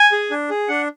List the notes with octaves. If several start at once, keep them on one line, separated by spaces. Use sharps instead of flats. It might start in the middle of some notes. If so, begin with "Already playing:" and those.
Already playing: G#5
G#4
D4
G#4
D4 F#5